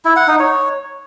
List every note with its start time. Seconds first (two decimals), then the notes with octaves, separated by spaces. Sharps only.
0.05 E4
0.16 F#5
0.28 D#4
0.39 C#5